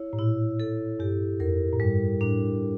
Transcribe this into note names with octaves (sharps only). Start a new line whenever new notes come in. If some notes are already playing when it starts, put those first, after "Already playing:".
Already playing: E4 C#5
A2
A#2 E4
A4
G2 G4
F2 A#4
A2
G2 G3
A2 D4